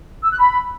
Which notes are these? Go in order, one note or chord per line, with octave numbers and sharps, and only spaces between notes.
E6
F#6
B5